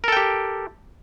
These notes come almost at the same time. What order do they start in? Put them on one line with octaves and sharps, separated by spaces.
A#4 A4 G5 G4